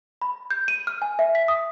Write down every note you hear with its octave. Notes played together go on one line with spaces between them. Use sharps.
B5
G6
D#7
F6
G#5
E5
B6
D#6